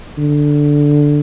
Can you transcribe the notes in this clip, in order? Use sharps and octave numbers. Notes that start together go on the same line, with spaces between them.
D3